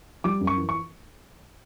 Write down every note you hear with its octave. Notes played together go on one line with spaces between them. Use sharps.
G3 D6
F#2
C#6
E3
C#6